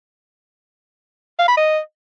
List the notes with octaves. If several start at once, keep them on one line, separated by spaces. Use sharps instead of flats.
F5
B5
D#5